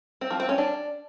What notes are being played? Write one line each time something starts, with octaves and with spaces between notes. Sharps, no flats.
C4
F3
C4
C#4
D4